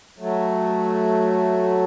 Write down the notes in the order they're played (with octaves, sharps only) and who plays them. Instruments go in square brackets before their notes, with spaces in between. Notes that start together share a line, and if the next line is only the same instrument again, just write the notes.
[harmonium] F#3 A3